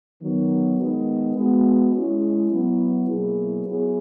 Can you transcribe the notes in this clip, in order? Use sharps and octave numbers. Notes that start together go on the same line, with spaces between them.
D#3 F#3 B3
D#3 G#3 B3 D#4
G#3 B3 F#4
G#3 C#4 E4
F#3 B3 E4
B2 F#3 A#3 E4 G#4
F#3 B3 E4 G#4